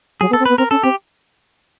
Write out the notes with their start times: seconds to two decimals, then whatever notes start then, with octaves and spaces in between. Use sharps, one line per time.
0.21 F#3 G#4
0.30 B3
0.33 A4
0.40 C4
0.46 B3 B4
0.58 C4 A#4
0.71 C#4 A4
0.83 C4 G4